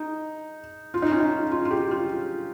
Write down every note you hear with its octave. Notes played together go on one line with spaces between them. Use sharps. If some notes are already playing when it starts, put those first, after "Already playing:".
Already playing: D#4
F4
D#4
C#4
D#4
F4
F4
G4
F4